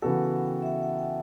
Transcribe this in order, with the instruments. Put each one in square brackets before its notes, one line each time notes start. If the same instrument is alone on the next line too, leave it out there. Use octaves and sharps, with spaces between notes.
[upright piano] C#3 E3 B3 F#4 A4 [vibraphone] F#5
[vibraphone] F#5
G5
E5
F#5
F#5
G5